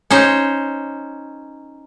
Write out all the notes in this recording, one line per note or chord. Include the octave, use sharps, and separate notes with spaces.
C#4 D#4 C5